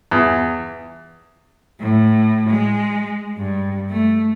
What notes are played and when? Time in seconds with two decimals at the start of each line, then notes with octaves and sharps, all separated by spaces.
0.11 E2
1.79 A2
2.48 G#3
3.37 G2
3.88 A3